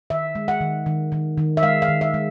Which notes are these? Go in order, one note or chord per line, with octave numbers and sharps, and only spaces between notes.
D#3 E5
G#3
F#5
D#3
D#3
D#3
D#3
E5
G#3 F5
F5
D#3
E5
G#3